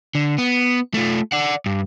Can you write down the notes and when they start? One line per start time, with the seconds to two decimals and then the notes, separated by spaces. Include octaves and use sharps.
0.15 D3
0.38 B3
0.94 A3 F4
1.32 D5 F#5
1.66 G2